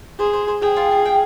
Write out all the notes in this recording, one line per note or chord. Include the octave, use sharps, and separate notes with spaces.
G#4 C5
C5
C5
G#4 G5
F4
F4
G5